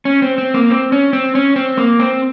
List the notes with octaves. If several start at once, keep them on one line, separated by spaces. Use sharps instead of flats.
C#4
C4
C4
A#3
C4
C#4
C4
C#4
C4
A#3
C4